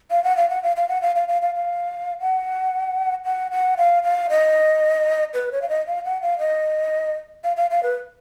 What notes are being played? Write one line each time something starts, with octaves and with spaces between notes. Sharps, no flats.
F5
F#5
F5
F#5
F5
F5
F#5
F5
F5
F5
F5
F5
F#5
F#5
F#5
F5
F5
D#5
B4
C#5
F5
D#5
F5
F#5
F5
D#5
F5
F5
F5
B4